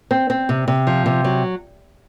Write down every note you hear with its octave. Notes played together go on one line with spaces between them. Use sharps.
C4
C4
C3
C3
F3
C3
F#3